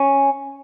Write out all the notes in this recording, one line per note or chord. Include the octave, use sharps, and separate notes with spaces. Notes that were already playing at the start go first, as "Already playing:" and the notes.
Already playing: C#4